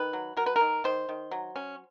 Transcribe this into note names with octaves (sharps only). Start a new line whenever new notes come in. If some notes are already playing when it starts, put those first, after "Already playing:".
Already playing: D#3 B4
F#3
F#3 A#4
B4
D#3 A#4
D#3 C5
D#3
F#3
C#4